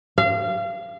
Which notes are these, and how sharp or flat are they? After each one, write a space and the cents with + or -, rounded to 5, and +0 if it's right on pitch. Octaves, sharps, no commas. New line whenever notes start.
F5 -30